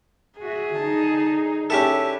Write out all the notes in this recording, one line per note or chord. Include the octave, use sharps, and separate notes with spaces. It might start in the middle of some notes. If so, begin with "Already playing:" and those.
F#4 G#4 E5
D3 D#4 A5
C#4 D4 E4 G4 A4 E5